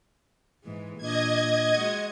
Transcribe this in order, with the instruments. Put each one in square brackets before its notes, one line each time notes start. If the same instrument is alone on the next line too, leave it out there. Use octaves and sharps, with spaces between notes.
[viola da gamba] G#2 E3 G#3
[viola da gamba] A#2 D4 [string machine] D#5 G#6
[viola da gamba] G#3 F#4